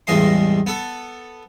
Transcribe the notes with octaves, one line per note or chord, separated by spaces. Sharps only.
A1 E2 G2 G#3 D#5 C6
B3 A4